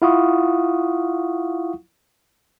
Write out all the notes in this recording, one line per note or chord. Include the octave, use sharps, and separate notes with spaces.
E4 F4 F5 F#5 C#6 D#6